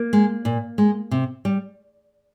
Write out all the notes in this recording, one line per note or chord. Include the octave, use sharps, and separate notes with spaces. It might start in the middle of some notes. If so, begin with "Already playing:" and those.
Already playing: A#3
G#3
A#2
G#3
C3
G3